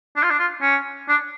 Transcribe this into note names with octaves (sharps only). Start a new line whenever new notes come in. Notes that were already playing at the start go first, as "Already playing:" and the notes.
D4
F4
D4
F4
C#4
D4